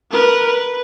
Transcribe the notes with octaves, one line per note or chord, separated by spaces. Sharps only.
A#4 B4
B4